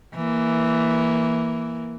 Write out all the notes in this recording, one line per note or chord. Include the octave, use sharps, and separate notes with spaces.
E3 A#3